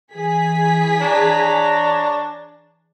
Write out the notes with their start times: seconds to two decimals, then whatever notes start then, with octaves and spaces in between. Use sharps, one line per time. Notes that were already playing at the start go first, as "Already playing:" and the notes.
0.12 E3 G#4 B6
1.01 D4 C#5 A#5